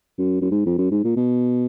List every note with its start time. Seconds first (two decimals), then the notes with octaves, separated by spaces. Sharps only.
0.18 F#2
0.41 F#2
0.51 G#2
0.66 F2
0.78 F#2
0.91 G#2
1.04 A#2
1.16 B2